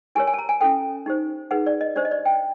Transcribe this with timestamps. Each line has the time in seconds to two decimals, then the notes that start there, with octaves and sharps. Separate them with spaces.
0.15 E4 G4 A#4 C#5 G#5
0.27 G#5
0.34 A5
0.39 A#5
0.49 G#5
0.61 C#4 E4 A4 G5
1.06 D#4 G4 C5
1.51 D#4 G#4 B4 F#5
1.66 D5
1.81 D#5
1.96 D4 G4 C5 D5
2.05 D#5
2.11 D5
2.25 G5